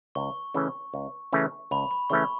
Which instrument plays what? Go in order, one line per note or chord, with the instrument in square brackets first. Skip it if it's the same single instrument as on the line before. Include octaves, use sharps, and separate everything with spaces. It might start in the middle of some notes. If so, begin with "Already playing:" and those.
[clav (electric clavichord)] C#2 [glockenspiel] C#6
[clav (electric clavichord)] C#3 E3 A3 C#4
C#2
C#3 E3 A3 C#4
[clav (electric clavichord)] C#2 [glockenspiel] B5
[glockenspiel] B5
[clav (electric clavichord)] C#3 E3 A3 C#4 [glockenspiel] C#6